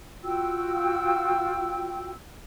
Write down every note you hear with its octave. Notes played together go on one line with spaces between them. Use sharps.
F4 F#4 G5 E6